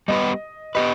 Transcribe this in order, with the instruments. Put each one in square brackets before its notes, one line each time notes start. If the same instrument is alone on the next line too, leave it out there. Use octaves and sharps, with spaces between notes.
[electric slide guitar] G3 B3 G4 B4 [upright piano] D#5
[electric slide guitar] B3 G4 B4 [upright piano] D#5